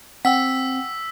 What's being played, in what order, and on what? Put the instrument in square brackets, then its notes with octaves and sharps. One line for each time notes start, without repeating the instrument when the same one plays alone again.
[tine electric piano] C4 [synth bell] F#5 G5 [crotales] E6 B6